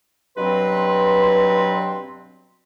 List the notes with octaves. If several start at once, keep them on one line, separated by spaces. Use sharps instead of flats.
G2 B2 F#3 C4 B4 C6